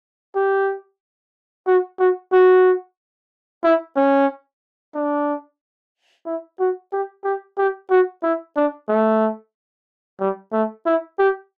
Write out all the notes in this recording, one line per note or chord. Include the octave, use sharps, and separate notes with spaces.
G4
F#4
F#4
F#4
E4
C#4
D4
E4
F#4
G4
G4
G4
F#4
E4
D4
A3
G3
A3
E4
G4